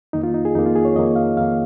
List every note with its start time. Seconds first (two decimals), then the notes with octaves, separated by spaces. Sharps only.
0.13 F2 D#3 A#3 D#4
0.23 F4
0.34 D#4
0.45 G#4
0.55 F2 D#3 A#3 D#4
0.66 F4
0.76 G#4
0.85 C#5
0.96 F2 D#3 A#3 D#5
1.16 F5
1.37 F2 D#3 A#3 F5